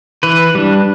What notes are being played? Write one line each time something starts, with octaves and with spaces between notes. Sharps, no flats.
E3 B4
G3 D4